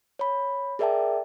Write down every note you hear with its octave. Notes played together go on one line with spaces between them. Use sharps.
C#5 B5
G#4 A#4 D5 E5 G5 A5